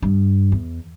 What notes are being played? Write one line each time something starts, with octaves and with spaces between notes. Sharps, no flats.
G2
E2